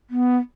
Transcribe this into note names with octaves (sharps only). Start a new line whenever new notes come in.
B3